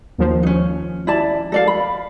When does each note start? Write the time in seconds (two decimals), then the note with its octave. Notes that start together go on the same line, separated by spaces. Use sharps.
0.18 D#2 F3
0.43 C#4 D#4
1.07 E4 D5 A5
1.52 A4 D5 F5
1.67 B5